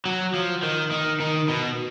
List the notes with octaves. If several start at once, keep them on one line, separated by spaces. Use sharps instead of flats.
F#3
F3
D#3
D#3
D#3
B2